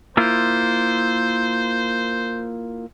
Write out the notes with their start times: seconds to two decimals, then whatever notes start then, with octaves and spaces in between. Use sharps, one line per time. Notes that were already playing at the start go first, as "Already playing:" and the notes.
0.17 A#3 E4 F4 C5